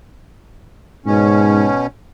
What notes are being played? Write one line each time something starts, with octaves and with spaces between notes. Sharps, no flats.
G#2 B2 C#4